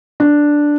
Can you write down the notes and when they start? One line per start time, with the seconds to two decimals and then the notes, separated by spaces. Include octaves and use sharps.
0.20 D4